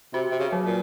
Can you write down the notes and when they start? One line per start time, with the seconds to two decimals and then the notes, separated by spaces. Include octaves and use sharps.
0.13 C3 F#4
0.31 C3
0.39 C#3
0.52 F#3
0.66 A#2